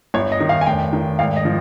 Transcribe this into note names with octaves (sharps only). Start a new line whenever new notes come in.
G1 C#5
D#5
D#3
F5
G#5
F1 G5
D#3
G#1 F5
D#5
F3